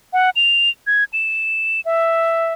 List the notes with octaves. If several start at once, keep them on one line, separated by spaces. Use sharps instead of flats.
F#5
F7
G#6
E7
E5